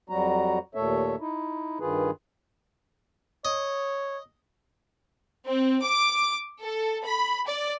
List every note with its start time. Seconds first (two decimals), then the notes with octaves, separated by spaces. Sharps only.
0.10 F2 F#3 G3 F#4 A#5
0.75 D#2 A#2 A3 A4 C#5 E5
1.20 D#4 E4
1.80 G2 D#3 F4 G#4 B4
3.45 C#5 D#5
5.47 C4
5.83 D6
6.61 A4
7.04 B5
7.47 D5